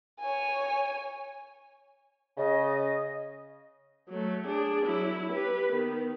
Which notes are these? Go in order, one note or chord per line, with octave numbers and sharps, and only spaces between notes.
C#5 G#5
C#3 D#5
F#3 A3
D4 G#4
F#3 E4
G4 B4
D#3 B3